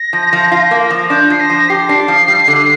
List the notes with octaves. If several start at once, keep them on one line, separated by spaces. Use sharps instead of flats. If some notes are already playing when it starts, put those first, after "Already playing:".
Already playing: A#6
F3
F3
F4
A#3
F3
D4 G6
F3 C7
A#6
F3
G4 C7
D4 C7
F3
G3
D3